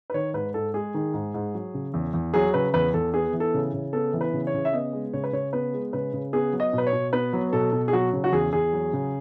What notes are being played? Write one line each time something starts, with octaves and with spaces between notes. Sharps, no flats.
B4
D#3 C#5
G#2 B4
G#2 A4
G#3 G#4
D#3
G#2
G#2
F#3
C#3
E2
E2
F#3 G#4
C#3 B4
E2 B4
E2 A4
B3 G#4
E3
A4
C#3
C#3
B3 A4
E3
B4
C#3
C#5
C#3
E5
B3 D#5
G#3
C#3 C#5
B4
C#3 C#5
B3 B4
G#3
C#3 B4
C#3
B3 G#4
F#3
D#5
B2
B4
C#5
B2
B3 B4
F#3
B2 A4
B2
G#4
F#3 F#4
C#3
F#4
E2 G#4
E2 G#4
F#3
C#3